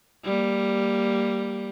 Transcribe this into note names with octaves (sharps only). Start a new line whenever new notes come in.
G3 A#3